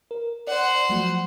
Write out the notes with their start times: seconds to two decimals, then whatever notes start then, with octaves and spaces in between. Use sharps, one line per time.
0.11 A#4
0.47 C5 D5 F#5
0.89 F3 F#3 A3